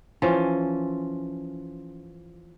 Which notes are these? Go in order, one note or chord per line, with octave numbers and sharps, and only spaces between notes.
E3 F3 C#4